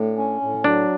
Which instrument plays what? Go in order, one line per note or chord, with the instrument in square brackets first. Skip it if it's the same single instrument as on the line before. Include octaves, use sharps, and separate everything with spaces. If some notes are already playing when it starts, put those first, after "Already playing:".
Already playing: [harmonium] A2 [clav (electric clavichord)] D4
[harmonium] C#4
A2
[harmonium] F#3 [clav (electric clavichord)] D4